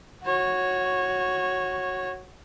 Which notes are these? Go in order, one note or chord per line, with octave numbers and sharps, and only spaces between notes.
F#4 C#5